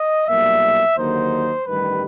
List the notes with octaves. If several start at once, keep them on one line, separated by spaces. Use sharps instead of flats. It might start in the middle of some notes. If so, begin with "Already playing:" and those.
Already playing: D#5
B1 A#2 G3 A#3 E5
D#2 D3 F#3 A#3 D#4 C5
A1 G2 D#3 G3 B4